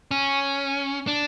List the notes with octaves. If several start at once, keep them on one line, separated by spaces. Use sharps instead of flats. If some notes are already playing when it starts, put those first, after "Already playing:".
C#4
D4